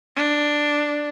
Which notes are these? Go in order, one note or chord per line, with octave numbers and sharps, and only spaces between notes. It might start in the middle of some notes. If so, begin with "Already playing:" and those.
D4